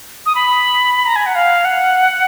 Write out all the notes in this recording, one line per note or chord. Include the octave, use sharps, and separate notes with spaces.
D#6
B5
A#5
G#5
F#5
F5
F#5